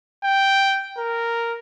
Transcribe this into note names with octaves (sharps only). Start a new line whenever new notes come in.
G5
A#4